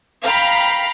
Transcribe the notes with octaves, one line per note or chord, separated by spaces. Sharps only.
F5 G5 A#5 B5